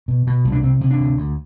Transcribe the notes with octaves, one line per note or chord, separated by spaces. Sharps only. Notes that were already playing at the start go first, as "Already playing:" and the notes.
B2
B2
C2
D4
C3 C4
C3
D4
D2
D2